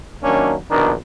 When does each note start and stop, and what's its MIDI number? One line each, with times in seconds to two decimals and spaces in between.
0.23 0.55 51
0.23 0.55 54
0.23 0.55 58
0.23 0.55 61
0.23 0.55 62
0.71 0.93 34
0.71 0.93 47
0.71 0.93 51
0.71 0.93 62
0.71 0.93 70